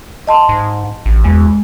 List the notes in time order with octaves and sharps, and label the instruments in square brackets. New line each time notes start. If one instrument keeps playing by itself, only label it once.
[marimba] D#5 A5 C6
[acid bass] G#2
A1
[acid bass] E2 [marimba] G#3